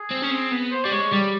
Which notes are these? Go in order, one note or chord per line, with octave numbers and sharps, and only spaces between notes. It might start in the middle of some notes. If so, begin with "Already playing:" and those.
Already playing: G#4
C4
C#4
C4
B3
C5
G3 D5
G#3 C#5
G3 D5